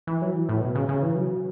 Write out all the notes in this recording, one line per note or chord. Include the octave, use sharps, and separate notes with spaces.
E3
F#3
E3
A2
B2
C#3
C#3
E3
F#3